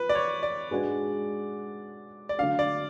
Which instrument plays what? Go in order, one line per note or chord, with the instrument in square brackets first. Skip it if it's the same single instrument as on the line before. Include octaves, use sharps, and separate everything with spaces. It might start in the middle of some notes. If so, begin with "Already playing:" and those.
Already playing: [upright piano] F3 [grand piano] B4
[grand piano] D5
C#5
D5
[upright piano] G#2 G#3 D4 F#4 B4
[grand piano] D5
[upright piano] D3 F#3 A3 D4 [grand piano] F5
[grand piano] D5